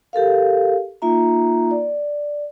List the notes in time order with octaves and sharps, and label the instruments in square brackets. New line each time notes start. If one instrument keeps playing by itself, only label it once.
[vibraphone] G4 A4 A#4 F5
A#3 D#4 F4 E5 A#5
D5